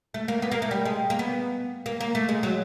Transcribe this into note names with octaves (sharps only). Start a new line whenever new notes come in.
A3
A#3
B3
A#3
A3
G3
G#3
A#3
B3
A#3
A#3
A3
G#3
F#3